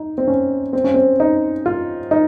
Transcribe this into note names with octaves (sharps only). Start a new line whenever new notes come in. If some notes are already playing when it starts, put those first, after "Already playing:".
Already playing: D#4
C4
C#4
C4
C#4
C4
D#4
F4
D#4